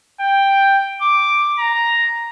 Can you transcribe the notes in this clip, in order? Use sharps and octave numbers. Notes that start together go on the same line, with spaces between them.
G5
D6
A#5